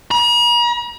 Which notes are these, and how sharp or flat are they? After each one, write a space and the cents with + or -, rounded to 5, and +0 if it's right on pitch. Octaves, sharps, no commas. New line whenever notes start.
A#5 +45